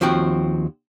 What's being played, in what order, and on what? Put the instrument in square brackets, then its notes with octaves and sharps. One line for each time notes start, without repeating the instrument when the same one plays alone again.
[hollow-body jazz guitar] D#2 F3 C4 F#4 G5